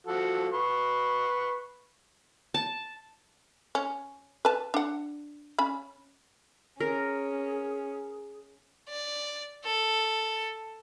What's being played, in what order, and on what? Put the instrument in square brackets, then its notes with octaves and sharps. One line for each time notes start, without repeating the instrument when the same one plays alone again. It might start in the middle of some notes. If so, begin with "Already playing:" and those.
[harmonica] F3 F#4 A4
B4 C#6
[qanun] A5
[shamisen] C#4
B4 A5
D4 F#5
C#4 B5
[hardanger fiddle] C#4 [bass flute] G#4 [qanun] A#4
[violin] D5
A4